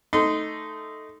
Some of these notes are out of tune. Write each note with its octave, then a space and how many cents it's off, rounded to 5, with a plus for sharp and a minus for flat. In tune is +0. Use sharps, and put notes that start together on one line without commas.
A3 +0 D#4 +0 C6 -25